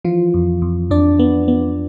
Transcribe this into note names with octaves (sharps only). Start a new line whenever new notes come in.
E3 F3 F4
F2
F2
F2 D4 D5
B3
B3